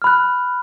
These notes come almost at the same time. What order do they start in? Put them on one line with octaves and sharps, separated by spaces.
F6 B5 F#6